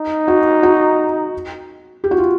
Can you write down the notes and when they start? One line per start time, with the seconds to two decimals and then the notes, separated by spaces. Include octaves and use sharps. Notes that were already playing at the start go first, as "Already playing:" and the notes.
Already playing: D#4
0.28 F#4
0.63 F#4
2.04 G4
2.11 F#4
2.18 F4